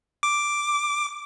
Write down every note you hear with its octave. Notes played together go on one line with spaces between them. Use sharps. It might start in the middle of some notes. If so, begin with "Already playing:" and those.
D6